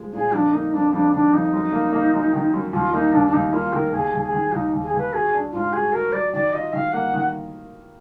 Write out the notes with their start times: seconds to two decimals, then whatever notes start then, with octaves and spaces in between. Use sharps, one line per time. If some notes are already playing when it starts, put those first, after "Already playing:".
Already playing: F3 G#3
0.13 A#2 G#4
0.33 F2 D4
0.53 A#3 D#4
0.73 F2 D4
0.92 F2 D4
1.13 D#3 D4
1.33 F2 D#4
1.53 F#2
1.73 A#3
1.92 A#3
2.13 F#2
2.33 D#3
2.53 F#2
2.72 D#2 F4
2.93 A#3 D#4
3.12 D#2 D4
3.27 D4
3.33 D#2 D#4
3.53 A#3 F4
3.73 D#3 A#4
3.92 D#2 G#4
4.13 D#2
4.23 G#4
4.32 D#3
4.52 D#2 D#4
4.73 D#2
4.83 G#4
4.93 D#2 B4
5.13 F#4 G#4
5.34 D4
5.52 G#2 F4
5.73 F#4 G#4
5.92 F#4 A#4
6.12 F#3 D5
6.33 D#3 D5
6.53 F4 D#5
6.73 D#3 F5
6.92 A#3 F#5
7.14 D#3